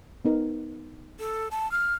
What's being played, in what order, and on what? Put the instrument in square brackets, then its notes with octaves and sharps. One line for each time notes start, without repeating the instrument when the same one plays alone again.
[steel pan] B3 D#4 A#4
[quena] A4
A5
F6